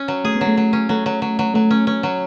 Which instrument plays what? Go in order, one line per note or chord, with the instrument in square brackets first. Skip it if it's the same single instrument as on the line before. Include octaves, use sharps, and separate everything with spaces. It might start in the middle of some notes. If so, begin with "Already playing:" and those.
Already playing: [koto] C#4
F#3
[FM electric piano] A3 [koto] G#4
[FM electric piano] B3
[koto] F#3
[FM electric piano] A3
[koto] F#3
C#4
[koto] F#3 [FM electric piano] A3
[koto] F#3
F#3
F#3
[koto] F#3 [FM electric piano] A3
[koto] C#4
C#4
F#3